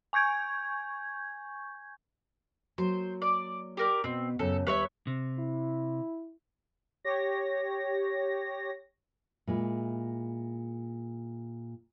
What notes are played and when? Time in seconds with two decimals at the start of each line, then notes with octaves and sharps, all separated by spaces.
0.13 G#5 C#6 G6 G#6
2.78 F#3 A#3 C5
3.22 D5
3.77 G4 A#4 D5
4.04 B2 C4
4.39 F#2 C#3 A4
4.67 D#2 G3 B4 C#5 E5
5.07 C3
5.39 E4
7.05 G4 C#5 A#6
9.47 A#2 G#3 E4